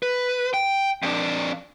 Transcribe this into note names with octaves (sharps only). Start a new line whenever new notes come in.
B4
G5
F2 D4